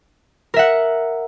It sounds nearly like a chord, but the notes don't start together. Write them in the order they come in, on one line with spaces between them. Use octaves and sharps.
A#4 E5 F#5